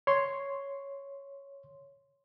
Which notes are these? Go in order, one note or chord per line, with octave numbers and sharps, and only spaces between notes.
C#5 C6